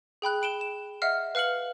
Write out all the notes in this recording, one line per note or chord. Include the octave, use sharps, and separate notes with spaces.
G#4 G5 B5 F#6
B5 D7 E7 G7
E7
D#5 E5 F#5 F6 C7
B4 F5 F6 C#7 F#7